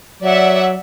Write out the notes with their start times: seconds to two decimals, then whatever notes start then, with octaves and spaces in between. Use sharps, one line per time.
0.23 F#3 D5 E5 F#5